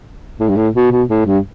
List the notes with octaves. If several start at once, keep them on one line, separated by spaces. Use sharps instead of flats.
A2
G2
A2
B2
B2
A2
G2